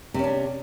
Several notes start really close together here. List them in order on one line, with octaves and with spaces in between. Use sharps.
C3 C#4 D4